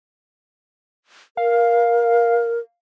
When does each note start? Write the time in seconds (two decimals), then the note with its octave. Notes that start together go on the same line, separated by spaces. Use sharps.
1.37 A#4 F5